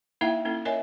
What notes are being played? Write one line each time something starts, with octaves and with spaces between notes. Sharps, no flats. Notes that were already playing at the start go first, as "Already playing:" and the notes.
A#3 D#4 E4 E5 F5 G5
A#3 C#4 E4 A4
A#4 C#5 D#5 E5 G#5